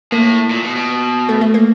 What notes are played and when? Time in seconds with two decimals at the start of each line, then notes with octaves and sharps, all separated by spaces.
0.12 A2 A#3
0.50 A#2
0.63 B2
0.76 B2
1.29 A3
1.41 A3
1.54 A#3